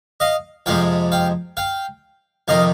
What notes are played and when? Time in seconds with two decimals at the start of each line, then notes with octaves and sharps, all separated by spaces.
0.20 D#5 F5
0.66 F2 C3 F3 G#3 F5 G5
1.12 F5 G5
1.57 F5 G5
2.48 F2 C3 D#3 D#5 F5